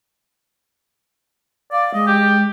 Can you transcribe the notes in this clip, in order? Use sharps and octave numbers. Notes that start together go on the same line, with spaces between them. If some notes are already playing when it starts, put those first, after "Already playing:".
D5 F5
G#3 D#5
G4